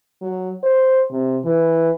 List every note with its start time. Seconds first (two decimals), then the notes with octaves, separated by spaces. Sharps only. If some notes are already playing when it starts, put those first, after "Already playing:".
0.22 F#3
0.63 C5
1.11 C3
1.45 E3